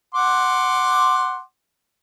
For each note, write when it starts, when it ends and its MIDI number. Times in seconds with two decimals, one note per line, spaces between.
0.14 1.41 78
0.14 1.41 84
0.14 1.41 86